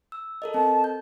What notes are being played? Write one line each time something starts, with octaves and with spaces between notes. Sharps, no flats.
E6
A4 A#4 D#5
C4 A5
G6